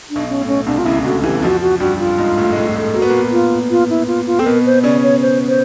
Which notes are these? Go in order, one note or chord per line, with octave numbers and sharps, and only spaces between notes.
D4
B1 B2
C#4
A2
C#4
B2
C2 C3 D4
F4
C#2 C#3 E4
D2 D3 F#4
E2 E3 G4
F2 F3 F#4
F#4
G2 G3 F#4
F4
G#2 G#3
A2 A3
G#3
A2 A3
A2 A3
A#3 F#4
B3
A#2 A#3
F4
F4
E4
F4
F4
C4 A4
B2 B3 A#4
C5
C#3 C#4 D5
C#5
C5
C5